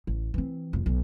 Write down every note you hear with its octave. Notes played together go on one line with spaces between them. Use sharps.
A1
E3 C4
E1 F2
B1